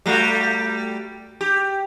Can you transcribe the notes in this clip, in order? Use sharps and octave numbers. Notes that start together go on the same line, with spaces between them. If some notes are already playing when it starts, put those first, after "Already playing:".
G3 A3 F#4
G4